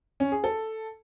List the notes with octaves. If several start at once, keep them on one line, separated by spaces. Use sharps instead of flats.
C#4
G#4
A4